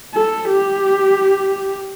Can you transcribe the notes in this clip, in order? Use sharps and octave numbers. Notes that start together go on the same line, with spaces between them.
A4
G4